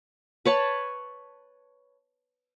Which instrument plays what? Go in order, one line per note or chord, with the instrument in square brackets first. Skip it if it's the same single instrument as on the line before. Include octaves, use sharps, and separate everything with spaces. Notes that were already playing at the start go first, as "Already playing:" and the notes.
[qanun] B4 C#5 A5